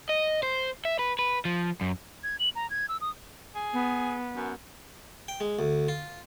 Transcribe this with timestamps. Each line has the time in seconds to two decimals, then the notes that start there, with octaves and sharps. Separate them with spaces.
0.09 D#5
0.43 C5
0.85 E5
0.99 B4
1.19 B4
1.45 F3
1.81 F#2
2.23 G#6
2.39 F#7
2.55 A#5
2.70 G#6
2.89 E6
3.01 D#6
3.55 G#4
3.73 B3
4.35 F#2
5.28 G5
5.40 G#3
5.59 D2
5.88 F4